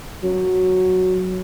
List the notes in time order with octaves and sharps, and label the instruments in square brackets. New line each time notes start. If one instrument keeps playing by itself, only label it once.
[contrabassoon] F#3